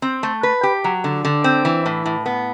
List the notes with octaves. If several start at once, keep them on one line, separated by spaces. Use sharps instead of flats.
C4
A3
B4
G4
F#3
D3
D3
C4
E3
A2
A2
B3